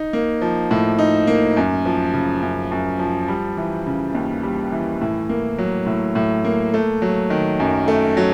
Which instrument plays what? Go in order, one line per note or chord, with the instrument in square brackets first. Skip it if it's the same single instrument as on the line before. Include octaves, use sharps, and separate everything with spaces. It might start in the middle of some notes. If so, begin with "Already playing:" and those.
Already playing: [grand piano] D#4
A#3
F3
A2
D#4
A#3
F#2
F3
C#3
F#2
F#2
F3
G3
E3
C#3
D#2
G3
E3
A2
A#3
F#3
A2
A2
A#3
A3
F#3
D#3
F#2
A3
F#3